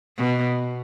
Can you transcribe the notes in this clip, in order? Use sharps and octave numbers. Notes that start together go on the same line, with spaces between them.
B2